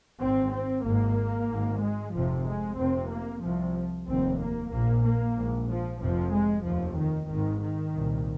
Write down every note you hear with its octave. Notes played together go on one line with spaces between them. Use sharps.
G#1 G#2 C4
C4
G#1 G#2 A#3
G#1 G#2
G#3
F1 F2 C3 F3
G#3
F1 F2 C3 C4
A#3
C2 C3 F3
F1 D#2 C4
A#3
A#1 A#2 A#3
A#3
A#1 G#2
F3
F1 F2 C3 F3
G#3
F1 D#2 F3
D#3
G#1 G#2 D#3
D#3
C2 A#2